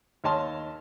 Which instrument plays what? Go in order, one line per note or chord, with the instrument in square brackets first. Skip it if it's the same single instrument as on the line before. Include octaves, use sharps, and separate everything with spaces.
[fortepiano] D#2 C#5 D#5 A5 C6 F6